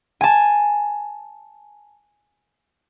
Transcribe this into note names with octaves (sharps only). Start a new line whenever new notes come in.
G#5 A5